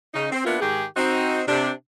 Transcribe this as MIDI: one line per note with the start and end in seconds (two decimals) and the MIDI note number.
0.14 0.30 49
0.14 0.30 63
0.32 0.44 60
0.45 0.60 58
0.45 0.60 59
0.45 0.60 62
0.45 0.60 64
0.45 0.60 65
0.45 0.60 70
0.60 0.83 44
0.60 0.83 51
0.60 0.83 67
0.60 0.83 68
0.96 1.41 60
0.96 1.41 63
0.96 1.41 66
1.47 1.70 48
1.47 1.70 62